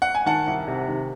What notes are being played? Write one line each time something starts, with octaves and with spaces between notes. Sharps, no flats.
F#5
G#5
D#3 F#5 A5
C2
C3
D#3